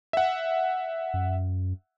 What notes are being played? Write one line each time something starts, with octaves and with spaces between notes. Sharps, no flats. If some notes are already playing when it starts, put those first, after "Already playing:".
E5 F#5
F#2